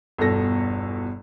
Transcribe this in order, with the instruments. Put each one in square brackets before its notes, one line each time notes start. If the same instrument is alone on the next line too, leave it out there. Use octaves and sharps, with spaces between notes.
[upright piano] G1 E2 B2 A4 A#6